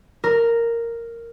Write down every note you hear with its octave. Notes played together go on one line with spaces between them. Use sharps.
A#4